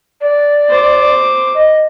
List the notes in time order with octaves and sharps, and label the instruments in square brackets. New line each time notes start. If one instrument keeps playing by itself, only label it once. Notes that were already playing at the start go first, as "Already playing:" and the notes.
[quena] D5
[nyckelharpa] C5 D6
[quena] D#5